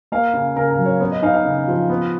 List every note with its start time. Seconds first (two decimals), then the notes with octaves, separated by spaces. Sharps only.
0.12 A#3 F5
0.34 C#3
0.56 C#3 A#4
0.71 A#4
0.78 F#3
0.86 C#5
1.00 B3 C#5
1.11 D#5
1.22 D#4 F5
1.34 F5
1.45 C#3
1.68 F3
1.90 B3